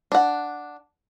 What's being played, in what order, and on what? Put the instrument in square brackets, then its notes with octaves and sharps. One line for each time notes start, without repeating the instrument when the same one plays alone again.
[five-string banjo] D4 F#5